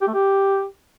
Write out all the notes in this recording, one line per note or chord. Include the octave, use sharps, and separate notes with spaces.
G4
A3
G4